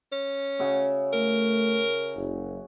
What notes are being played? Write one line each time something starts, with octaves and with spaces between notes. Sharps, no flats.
C#4
C#3 F#4 E5
A3 A#4
F#1